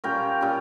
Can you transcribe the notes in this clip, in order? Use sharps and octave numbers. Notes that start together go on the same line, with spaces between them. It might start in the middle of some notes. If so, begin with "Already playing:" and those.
A#2 G3 C#4 G5 A#5
A#2 G3 C#4